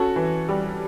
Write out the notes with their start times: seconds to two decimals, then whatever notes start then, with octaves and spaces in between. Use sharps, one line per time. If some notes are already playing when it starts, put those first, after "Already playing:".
Already playing: C#4 F#4 A4
0.16 E3
0.48 G3